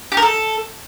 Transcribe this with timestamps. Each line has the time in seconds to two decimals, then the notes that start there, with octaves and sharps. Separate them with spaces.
0.12 G4
0.17 A#4
0.22 A4